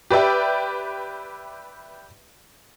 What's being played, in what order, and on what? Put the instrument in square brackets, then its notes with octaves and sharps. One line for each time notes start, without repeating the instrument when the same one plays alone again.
[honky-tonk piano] G4 B4 D5 E5 G5